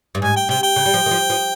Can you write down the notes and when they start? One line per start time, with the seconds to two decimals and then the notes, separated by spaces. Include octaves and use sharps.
0.15 G2
0.22 G#2 G#5
0.36 G5
0.49 C3 G5
0.63 G5
0.76 C#3
0.86 G3
0.94 F3
1.06 D#3
1.11 F3
1.30 F3